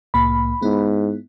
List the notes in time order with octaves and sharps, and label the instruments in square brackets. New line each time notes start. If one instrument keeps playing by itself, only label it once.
[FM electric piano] C2 A2 A#3 [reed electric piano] B5
[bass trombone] G#2 [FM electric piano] B3 E4